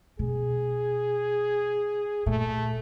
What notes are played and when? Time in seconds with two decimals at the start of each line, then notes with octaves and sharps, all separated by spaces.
0.19 B2 G#4
2.26 A#2 A3